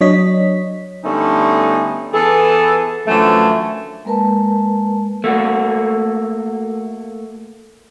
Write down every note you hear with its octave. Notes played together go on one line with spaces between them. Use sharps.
F#3 D4 C#5 D#5 B6
D3 G3 A3 B3 C#4 D#4
E3 B3 G#4 A4
F#2 D3 E3 F3 A3
G#3 A#3 A#4 B4 A5
A3 A#3 F#4